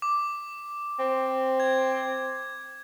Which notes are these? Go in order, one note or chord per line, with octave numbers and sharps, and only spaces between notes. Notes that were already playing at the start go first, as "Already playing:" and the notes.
D6
C4
G#6